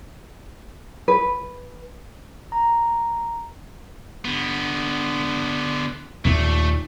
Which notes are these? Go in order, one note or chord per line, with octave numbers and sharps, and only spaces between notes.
B4
A#5
D3 B3
D#2 A#2 A3